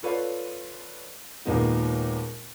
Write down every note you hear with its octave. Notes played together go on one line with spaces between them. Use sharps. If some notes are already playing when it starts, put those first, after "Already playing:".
F4 A4 B4 C#5 D5 F5
D#2 A#2 G#3 B3 D#4